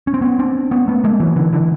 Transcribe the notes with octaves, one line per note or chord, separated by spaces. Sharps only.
C#4
C4
B3 C#4
C4 D4
B3 C#4
A3 B3
G#3 A#3
E3 F#3
D3 E3
D3 E3